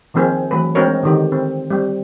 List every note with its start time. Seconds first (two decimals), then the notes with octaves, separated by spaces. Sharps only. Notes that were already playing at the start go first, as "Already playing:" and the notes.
0.14 D#3 F3 A#3 C4 G#4
0.51 E3 F#3 A3 B4
0.75 G#3 C4 D4 F#4 A#4 C#5
1.03 D3 D#3 G4
1.32 C4
1.70 G3 C4